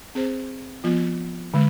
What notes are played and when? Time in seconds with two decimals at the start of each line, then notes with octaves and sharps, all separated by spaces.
0.15 C4 G#4 C5
0.84 F3 B3 F4
1.54 D3 G#3